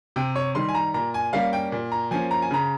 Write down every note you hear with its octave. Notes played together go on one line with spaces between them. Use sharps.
C3 G5
C#5
D#3 G3 C6
G#5
A#5
A#2 A#5
G#5
G3 A#3 C#4 F5
G5
A#2
A#5
F3 A#3 C#4 G#5
A#5
G#5
C#3 A#5